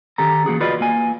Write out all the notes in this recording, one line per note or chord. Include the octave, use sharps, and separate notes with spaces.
D#3 C#4 G4 A4 A#5
E3 A#3 F#4 G#4
F4 F#4 B4 D5 D#5
A#3 G#5